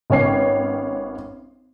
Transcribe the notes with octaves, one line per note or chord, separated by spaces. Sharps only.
G#1 B3 C#4 C#5 G5 C7